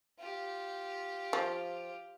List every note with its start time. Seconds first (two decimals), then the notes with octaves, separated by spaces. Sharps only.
0.19 F4 G4
1.33 F3